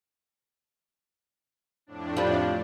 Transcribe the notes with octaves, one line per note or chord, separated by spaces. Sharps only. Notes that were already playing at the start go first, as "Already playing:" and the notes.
F2 A2 D4
F3 G3